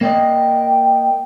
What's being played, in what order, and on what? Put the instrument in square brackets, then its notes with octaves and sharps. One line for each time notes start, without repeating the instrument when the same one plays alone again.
[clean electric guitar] A#3 D5 D#5 [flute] G5